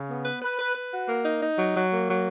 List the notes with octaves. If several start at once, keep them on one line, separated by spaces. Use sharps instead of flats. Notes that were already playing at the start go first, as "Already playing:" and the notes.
Already playing: C#3
B3
B4
B4
B4
B4
F#4
A#3
D#4
D#4
F#3
F#3
A#3
F#3